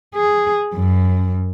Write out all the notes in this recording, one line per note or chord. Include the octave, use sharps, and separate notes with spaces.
G#4
F#2